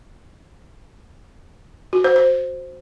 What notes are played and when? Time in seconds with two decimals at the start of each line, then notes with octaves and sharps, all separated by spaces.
1.93 F#4
2.04 C5
2.16 C5